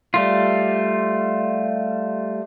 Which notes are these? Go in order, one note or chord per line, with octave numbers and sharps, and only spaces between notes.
G3 A3 F4